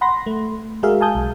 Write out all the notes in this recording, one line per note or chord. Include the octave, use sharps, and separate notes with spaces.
F#5 B5 C6 A#6
A3
G#3 F#4 G#4 A#4 E5 F5
F5 G#5 A5 D#6 G6
B1